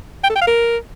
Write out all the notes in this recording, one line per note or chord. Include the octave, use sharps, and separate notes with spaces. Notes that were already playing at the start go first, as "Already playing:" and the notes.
G5
A4
G5
F5
A#4